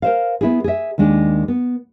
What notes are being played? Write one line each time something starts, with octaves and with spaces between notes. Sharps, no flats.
A#4 C5 F5
B3 E4 G#4
G#4 E5
D#2 D#3 G#3 D4
B3